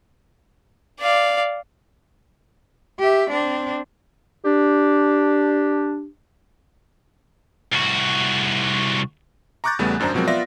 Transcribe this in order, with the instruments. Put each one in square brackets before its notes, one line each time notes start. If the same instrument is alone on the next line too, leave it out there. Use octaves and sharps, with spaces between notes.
[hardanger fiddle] D5 F5
[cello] G4 E5
C4 D4
[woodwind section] D4 G4
[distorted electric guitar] C2 F#4
[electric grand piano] A#5 C#6 D6 F#6 G6 A6
E2 C#3 G3 A3 B3
G#1 F#2 D4 C5 A#5
B2 F3 F#3 G#3 C4 A#4
B3 F4 D5 E5 A#6